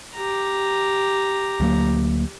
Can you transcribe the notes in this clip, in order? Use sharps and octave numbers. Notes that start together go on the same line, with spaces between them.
G4 A#5
D2 F#3 A#3